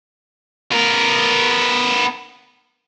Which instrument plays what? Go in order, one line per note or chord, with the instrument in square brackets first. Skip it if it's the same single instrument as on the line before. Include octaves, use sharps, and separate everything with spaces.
[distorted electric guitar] B3 A#4